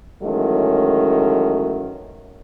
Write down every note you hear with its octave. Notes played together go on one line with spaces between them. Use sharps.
D#3 E3 F#3 G#3 A3 C#4